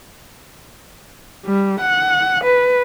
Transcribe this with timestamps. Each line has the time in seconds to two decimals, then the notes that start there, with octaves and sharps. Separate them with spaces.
1.45 G3
1.81 F#5
2.44 B4